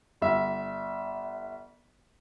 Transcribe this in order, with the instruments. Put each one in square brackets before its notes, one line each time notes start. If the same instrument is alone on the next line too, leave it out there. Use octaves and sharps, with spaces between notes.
[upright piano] G1 E5